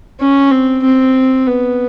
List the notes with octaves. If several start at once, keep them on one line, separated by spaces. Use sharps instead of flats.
C#4
C4
C4
B3